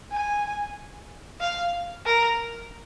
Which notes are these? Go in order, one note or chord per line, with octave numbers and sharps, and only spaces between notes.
G#5
F5
A#4